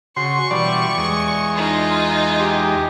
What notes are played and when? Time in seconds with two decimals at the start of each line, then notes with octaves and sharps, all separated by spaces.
0.17 C#3 F#4 C6 C#6
0.51 B2 E3 G3 D5
0.98 E2 G#3 D#6
1.56 D#4 F4 C6
2.39 G4